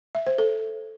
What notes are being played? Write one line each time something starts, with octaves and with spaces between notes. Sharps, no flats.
E5
C5
A4